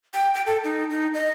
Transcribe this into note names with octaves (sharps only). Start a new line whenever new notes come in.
G5
G5
A4
D#4
D#4
D#5